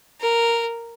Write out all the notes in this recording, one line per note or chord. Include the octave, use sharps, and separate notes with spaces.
A#4